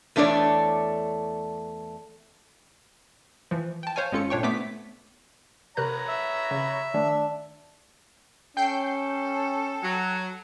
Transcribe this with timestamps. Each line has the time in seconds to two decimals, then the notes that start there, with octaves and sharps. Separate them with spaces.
0.16 E2 A3 D4 C#5 D5
3.51 E3 F3
3.83 G5 A5
3.96 C5 C#5 F5 G#5
4.12 G#1 G#3 C#4 F4 A4 C#7
4.30 A#2 D4 C#5 G5 C#6
4.43 A3 B3 C4 D6 B6
5.77 C3 A#4 C#5 A#5 B5 F#6
6.08 E5
6.51 C#3
6.94 D#3 A3 D4
8.57 C#4 A4 G5 G6 C7
9.83 F#3